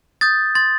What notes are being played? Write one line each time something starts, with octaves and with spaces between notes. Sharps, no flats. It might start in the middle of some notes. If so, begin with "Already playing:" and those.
D#6 G6 A6
C6 A6